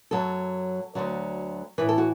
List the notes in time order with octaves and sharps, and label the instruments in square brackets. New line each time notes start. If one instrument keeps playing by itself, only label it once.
[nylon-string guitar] F#2 F#3 A4
D2 D3 F#3
A2 E3 B4
A4
F#4